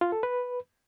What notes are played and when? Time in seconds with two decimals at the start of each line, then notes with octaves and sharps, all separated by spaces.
0.01 F4
0.12 A4
0.23 B4